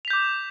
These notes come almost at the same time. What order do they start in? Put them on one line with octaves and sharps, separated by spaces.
F7 B6 G6 D6